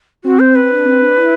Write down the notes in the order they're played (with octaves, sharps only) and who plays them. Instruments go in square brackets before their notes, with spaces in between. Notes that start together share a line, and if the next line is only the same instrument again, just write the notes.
[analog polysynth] C4 [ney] F#4
[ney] C5
B4
[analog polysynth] C4
D4
C4
D4
E4